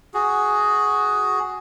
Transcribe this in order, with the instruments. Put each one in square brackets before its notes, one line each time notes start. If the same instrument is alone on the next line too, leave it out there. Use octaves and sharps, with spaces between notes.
[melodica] F#4 G#4